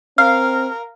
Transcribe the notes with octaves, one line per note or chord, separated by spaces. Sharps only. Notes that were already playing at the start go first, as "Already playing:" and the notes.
C4 A#4 F5 F6